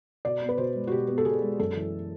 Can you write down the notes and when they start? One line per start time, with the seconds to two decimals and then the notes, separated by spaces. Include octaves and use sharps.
0.25 B2 D5
0.41 B3
0.49 B4
0.58 B2 C5
0.75 G#3
0.87 F#4
0.91 B2 G4
1.08 B3
1.18 A4
1.25 B2 G#4
1.42 G#3
1.59 F#2 A4
1.76 E3